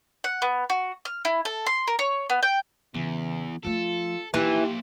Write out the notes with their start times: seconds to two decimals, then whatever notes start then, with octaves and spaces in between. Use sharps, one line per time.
0.24 F#5
0.42 B3
0.70 F#4
1.05 F6
1.25 E4
1.45 A4
1.66 C6
1.87 A#4
1.99 C#5
2.30 B3
2.43 G5
2.94 E2 C#3 E3
3.65 F3 A3 F4 A4
4.34 A#2 E3 D#4 G4 C5